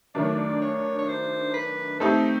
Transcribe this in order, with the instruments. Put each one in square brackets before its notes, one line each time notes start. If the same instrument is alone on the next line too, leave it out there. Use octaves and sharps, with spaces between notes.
[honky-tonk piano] D#3 F#3 A3 D4 [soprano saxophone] D5
[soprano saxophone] C#5
D5
C#5
C#5
C5
B4
[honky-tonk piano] A3 C4 D#4 G4 [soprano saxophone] A4